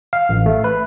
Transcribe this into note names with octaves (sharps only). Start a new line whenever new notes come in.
F5
A1
A3
B4